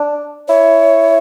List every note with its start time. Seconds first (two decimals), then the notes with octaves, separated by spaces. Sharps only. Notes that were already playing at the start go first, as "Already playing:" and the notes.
Already playing: D4
0.48 E4 C#5